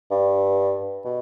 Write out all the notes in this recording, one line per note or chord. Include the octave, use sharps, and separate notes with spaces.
G2
B2